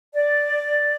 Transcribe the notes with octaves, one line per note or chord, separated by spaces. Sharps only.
D5